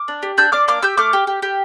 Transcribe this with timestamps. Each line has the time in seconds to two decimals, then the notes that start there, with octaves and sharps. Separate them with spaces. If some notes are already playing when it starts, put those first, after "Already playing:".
Already playing: D6 F6
0.08 D4
0.22 G4
0.38 D4 E6 G6
0.52 D4 D6 F6
0.68 A#3 D6 F6
0.83 G4 E6 G6
0.97 A3 D6 F6
1.13 G4
1.27 G4
1.42 G4